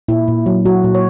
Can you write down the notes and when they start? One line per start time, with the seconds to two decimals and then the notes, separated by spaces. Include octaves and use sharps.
0.08 A#2 E4
0.28 A#2
0.46 F#3
0.65 F#3 F#4
0.84 A#2
0.95 C#5